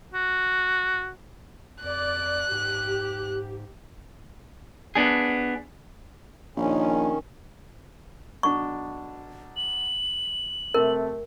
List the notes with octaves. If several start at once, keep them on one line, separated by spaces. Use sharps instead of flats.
F#4
F2 D5 F#6
G#2 G4
B3 D4 G#4
A#1 D#3 C#4
B1 D4 C#6
F#7
C3 A3 A#4